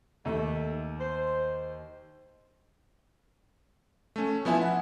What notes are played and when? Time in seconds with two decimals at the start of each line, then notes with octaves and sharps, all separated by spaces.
0.25 D#2 A3
0.99 C5
4.16 A3 C#4
4.45 F3 B3 E4 E5 G#5
4.61 F#5